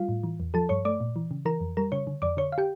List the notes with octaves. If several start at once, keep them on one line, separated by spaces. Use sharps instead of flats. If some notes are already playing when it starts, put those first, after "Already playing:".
Already playing: G3 F4 F5
A2
E3
E2
F3 A4 A5
G2 C#5 C#6
A3 D5 D6
A#2
E3
C#3
E3 A#4 A#5
F2
G3 A#4 A#5
C#3 C#5 C#6
D3
F2 D5 D6
D3 C#5 C#6
F5
G4 G5